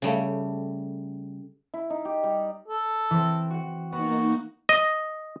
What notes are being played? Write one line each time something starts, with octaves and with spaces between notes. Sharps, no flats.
C#3 G3 A3
E4
D#4
G4
G3
A4
E3 C4
F#4 F#5
A#3 B3 D#4 F#4
D#5